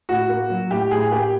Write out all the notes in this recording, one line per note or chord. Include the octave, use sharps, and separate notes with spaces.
A2 F#4
A#3
F#3
A2 G4
A2 G#4
A#3 G4